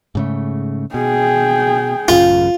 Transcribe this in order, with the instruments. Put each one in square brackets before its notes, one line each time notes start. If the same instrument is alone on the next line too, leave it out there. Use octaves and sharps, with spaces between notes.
[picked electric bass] G#2 C#3 A3
[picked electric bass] B2 [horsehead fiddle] G#4 G5
[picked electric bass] A1 F#2 C#3 [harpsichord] F4